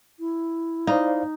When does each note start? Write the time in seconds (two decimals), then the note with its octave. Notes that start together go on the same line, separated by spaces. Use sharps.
0.20 E4
0.87 D#4 C5 D5 F5